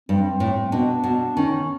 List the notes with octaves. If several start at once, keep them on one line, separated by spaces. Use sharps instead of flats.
G2 C4
A2
B2 D4
B2
D#3 C#4